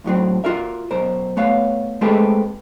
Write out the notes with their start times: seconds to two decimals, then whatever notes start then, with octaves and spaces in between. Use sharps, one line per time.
0.04 E2 A2 F#3 C4
0.44 F4 F#4 A#4 E5
0.91 B1 B2 A#4 C5
1.37 A3 B3 C#5 F5
2.01 G#3 A3 C4 G4 A4 B4